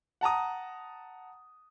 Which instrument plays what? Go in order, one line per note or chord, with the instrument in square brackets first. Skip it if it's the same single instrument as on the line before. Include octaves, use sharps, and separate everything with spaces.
[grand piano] F#5 A5 A#5 D#6